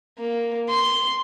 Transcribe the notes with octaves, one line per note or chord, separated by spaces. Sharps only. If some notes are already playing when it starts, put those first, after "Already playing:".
A#3
C6